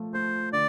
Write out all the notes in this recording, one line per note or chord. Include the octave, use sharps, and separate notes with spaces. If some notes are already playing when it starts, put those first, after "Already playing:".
Already playing: F3 A3
A3 C5
D3 D5